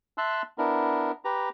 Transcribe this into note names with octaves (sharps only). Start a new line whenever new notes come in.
E5 A5 C6 E6 F#6
B3 D4 E4 A#4
G4 B4 A#5